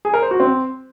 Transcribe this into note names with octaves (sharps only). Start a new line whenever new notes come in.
G#4
A#4
C5
F#4
C4